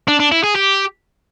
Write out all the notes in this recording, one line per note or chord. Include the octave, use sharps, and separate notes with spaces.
D4
D4
E4
G#4
G4